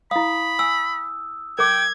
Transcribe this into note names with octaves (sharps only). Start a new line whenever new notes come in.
E4 F5 B5 D#6
G#5 E6
A#4 G5 D6 G#6